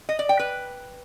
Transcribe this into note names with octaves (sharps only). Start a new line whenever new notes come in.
D#5
D5
G5
B4